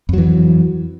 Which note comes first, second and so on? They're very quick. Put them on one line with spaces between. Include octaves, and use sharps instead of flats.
F2 F#3 E3